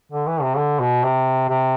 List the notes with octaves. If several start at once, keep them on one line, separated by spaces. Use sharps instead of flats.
D3
E3
C3
D3
B2
C3
C3